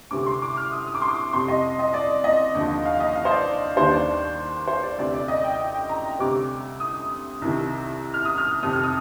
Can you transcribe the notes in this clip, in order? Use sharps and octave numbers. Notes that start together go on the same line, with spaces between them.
D2 C3 G3 C4 D6
C6
D6
F6
D#6
D#6
D6
C6
D6
F2 C3 G3 C6
D#5
D#5
D5
D#5
D#2 D3 F3
F5
D#5
F5
C5
D5
D#2 D#3 G3 A#3 D4 C5
D5
C5
D5
D2 C3 G3 C4 D5
D5
D#5
G5
G5
G5
A#5
D2 C3 G3 C4 D6
D#6
C2 C3 D#3
F6
D#6
F6
F2 C3 D#3 D#6
F6
D#6